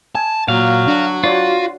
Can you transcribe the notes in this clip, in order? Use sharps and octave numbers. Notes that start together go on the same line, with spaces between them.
G#5 A5
A#2 F#3 F5
D4 F#4
F4 C#5 D5